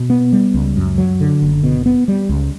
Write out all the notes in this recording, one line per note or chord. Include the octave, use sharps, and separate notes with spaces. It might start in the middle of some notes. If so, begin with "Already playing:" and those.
Already playing: B2
B3
G3
C#2
F#2
F#3
D3
F#1
B2
B3
G3
C#2